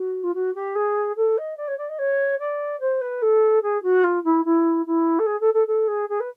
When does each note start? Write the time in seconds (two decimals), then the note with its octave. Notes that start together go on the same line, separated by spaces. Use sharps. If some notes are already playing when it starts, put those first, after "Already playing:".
Already playing: F#4
0.23 F4
0.34 F#4
0.55 G4
0.75 G#4
1.16 A4
1.38 D#5
1.57 D5
1.68 C#5
1.78 D5
1.89 D#5
1.98 C#5
2.39 D5
2.80 C5
3.01 B4
3.22 A4
3.62 G#4
3.83 F#4
4.04 F4
4.24 E4
4.45 E4
4.86 E4
5.19 A4
5.26 G#4
5.40 A4
5.54 A4
5.67 A4
5.88 G#4
6.09 G#4
6.20 B4